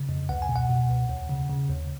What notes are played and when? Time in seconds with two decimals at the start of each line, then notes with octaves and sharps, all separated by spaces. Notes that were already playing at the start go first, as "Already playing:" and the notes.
Already playing: C#3
0.09 F2
0.29 C#2 F#5
0.42 G#5
0.49 B2
0.56 F#5
0.69 B2
0.89 C#2
1.09 D#2
1.29 C#3
1.50 C#3
1.69 D#2